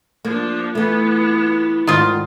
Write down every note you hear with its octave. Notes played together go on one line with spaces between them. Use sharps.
F3 A#3 D4
E3 A3 B3 F4
D2 G#2 D#3 F4